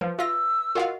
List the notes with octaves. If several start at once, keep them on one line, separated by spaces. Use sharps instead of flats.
F3 B4
F4 E5 E6 A#6
F4 F#4 A#4 D#5 F5 F#5